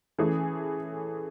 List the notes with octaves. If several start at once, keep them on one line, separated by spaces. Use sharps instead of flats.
E3 A3 C#4 G#4